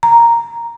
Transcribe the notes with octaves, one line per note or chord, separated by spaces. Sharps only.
A#5